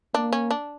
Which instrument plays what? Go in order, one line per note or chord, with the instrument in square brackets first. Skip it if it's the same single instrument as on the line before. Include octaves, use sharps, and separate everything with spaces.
[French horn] A#3 [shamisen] D4
[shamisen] C#4
D4